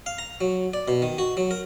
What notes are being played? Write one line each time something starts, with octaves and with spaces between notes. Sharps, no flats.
F5
A#5
F#3
D5
B2
D#3
F#4
F#3
A#4